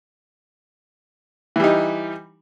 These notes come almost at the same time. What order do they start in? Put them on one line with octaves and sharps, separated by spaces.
E3 G3 D#4